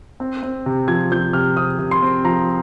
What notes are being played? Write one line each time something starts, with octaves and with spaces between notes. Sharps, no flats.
C4
C4
C3
F3 G#6
F3 G6
C3 F6
C3 D#6
C3
C6
C4
F3 A#5